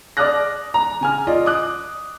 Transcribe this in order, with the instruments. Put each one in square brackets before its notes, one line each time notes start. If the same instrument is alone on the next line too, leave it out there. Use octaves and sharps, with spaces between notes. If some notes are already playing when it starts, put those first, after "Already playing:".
[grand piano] D5 D6 D#6 F6 F#6 A#6
A#5
C#3 G#5 F6
F4 D5 D#5
D6 D#6 F#6